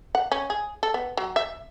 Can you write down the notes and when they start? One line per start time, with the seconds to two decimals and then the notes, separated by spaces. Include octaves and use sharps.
0.15 F#5
0.32 C#4
0.50 G#4
0.83 A4
0.94 B3
1.17 F#3
1.36 E5